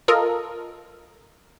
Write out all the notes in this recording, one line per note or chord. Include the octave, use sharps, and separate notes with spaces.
F4 A4 A#4 D#5